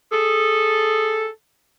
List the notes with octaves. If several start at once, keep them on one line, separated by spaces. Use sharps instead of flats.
G#4 A4